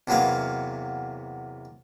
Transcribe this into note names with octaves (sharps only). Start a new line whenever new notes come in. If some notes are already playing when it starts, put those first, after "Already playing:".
E2 C3 F#3 A#3 B3 F5